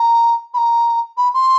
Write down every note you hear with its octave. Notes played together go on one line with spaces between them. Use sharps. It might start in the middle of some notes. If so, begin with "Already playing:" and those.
Already playing: A#5
B5
A#5
B5
C6